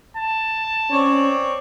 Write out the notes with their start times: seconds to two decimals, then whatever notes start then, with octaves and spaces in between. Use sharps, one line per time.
0.17 A5
0.91 C4 C#4 C#5 D5